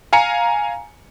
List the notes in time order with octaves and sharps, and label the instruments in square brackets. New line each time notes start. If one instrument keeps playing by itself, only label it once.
[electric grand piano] F5 G#5 A#5 C#7